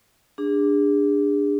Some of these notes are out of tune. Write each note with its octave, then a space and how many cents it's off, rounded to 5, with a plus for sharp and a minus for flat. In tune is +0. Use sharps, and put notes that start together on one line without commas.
D4 +0 G#4 -35